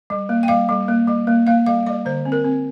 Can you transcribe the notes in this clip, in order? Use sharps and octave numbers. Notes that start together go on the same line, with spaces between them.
G3
A#3
G5
G3 F5
G3
A#3
G3
A#3
A#3 F5
G3 F5
G3 D5
D3 C5
C4
A#4
C4